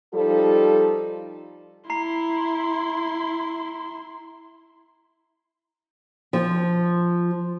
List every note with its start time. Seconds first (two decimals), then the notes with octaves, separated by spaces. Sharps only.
0.14 F3 G3 D#4 F4 A4
1.90 E4 A#5 C6 C7
6.33 F3